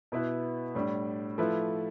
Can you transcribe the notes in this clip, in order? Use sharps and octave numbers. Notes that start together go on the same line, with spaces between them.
B2 B3 E4 B4
A2 G3 D4
F3 A3 E4 B4